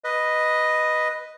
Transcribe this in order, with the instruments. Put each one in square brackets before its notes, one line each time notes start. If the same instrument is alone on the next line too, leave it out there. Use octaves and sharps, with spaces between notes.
[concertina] B4 D#5